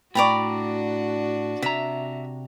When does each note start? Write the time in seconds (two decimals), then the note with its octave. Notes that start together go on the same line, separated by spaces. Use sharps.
0.15 A2 D4 F#4 D5 G5 A#5 B5 C#6
1.63 C3 E5 A#5